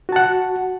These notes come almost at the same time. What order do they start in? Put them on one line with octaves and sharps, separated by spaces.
F#4 A5 F#5